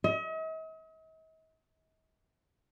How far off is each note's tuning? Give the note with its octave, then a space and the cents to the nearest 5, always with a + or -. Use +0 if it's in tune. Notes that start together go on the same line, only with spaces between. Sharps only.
D#5 +45